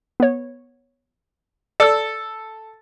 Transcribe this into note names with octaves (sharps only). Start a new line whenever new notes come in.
B3 C#5
A4 D5 E6